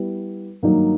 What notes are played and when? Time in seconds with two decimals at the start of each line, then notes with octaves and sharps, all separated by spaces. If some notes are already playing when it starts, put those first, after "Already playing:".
Already playing: G3 B3 E4
0.62 G2 D#3 F#3 A#3 D#4